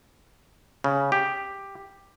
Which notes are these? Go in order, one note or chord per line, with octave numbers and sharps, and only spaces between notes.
C#3
G4